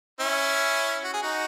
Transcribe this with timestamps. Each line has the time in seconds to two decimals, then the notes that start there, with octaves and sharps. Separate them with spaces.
0.20 C#4 E4
1.04 F#4
1.13 G#4
1.22 D#4 F#4